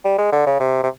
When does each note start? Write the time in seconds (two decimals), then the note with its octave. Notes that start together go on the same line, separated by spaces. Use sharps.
0.05 G3
0.18 G#3
0.32 D3
0.46 C#3
0.60 C3
0.83 C3